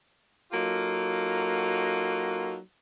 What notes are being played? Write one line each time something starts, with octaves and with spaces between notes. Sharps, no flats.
F#3 A#3 D#4 F4 F#4 A4